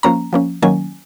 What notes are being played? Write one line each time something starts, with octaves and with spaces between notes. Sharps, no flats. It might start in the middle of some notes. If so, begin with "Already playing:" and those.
F3 A#3 C#4 A#5
F3 A#3 C#4
D#3 F#3 A#3 C#4 G#5